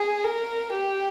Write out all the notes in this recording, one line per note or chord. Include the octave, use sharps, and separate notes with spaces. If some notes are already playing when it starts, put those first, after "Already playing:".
Already playing: G#4
A#4
G4